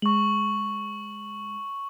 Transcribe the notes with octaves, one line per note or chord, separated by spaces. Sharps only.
G#3 C#6 F#7